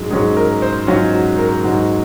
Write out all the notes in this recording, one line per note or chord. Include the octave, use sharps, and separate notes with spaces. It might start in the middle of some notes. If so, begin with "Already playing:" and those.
Already playing: G#2 F#3 C#4 G#4
G#2 F#3 C#4 G#4
A#4
C5
G#2 F#3 C#4 F4
F#4
A#4
G#2 F#3 C#4 F#4